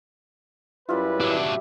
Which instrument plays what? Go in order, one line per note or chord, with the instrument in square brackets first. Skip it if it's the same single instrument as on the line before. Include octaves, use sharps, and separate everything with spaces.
[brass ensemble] F#2 C#4 B4 [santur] G3 F4 [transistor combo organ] E4
[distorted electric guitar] F#3 D4 [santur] G4 E5